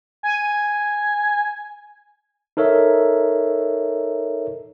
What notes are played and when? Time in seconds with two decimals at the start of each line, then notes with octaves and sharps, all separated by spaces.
0.23 G#5
2.57 D#4 A4 A#4 C#5 E5